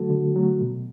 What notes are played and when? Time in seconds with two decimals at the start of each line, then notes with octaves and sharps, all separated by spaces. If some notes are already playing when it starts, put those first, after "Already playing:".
Already playing: D3 F#3 A3 F#4 A4
0.10 D3
0.36 F#3 A3
0.61 B2